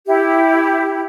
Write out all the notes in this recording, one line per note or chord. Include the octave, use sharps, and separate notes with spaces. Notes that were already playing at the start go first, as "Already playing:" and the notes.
E4 G4